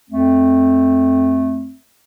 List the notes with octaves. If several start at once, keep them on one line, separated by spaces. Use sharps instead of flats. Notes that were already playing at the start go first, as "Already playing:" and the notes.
F2 A3 C4